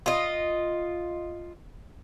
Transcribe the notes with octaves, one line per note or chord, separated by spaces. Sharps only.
F4 D#5